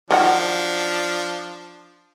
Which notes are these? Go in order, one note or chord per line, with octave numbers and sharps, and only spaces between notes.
D#3 F3 F#3 D4 F#5